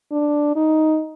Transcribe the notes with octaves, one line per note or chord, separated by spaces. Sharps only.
D4
D#4